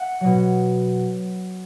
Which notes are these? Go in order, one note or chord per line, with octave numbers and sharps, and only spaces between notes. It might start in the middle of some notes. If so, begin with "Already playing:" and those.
Already playing: E5 F#5
B2 F#3